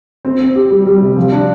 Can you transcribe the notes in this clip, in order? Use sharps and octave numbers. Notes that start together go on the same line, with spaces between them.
C4
C4
G4
G3
G3
C3
F3
D4